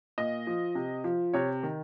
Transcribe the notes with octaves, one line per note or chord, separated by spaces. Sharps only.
A#2 D#5
F3
C3
F3
C3 C#5
D#3